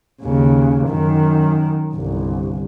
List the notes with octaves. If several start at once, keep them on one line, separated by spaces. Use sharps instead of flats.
D#2 C#3
F#2 D#3
G1 C2